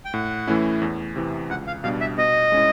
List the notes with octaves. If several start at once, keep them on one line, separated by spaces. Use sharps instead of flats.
G5
A2 F#5
E3 A3 C#4 E4
E2
C3 E3
C#2 F#5
F5
B2 G3 B3 D4 F5
E5
B2 D#5
G#3 C#4 E4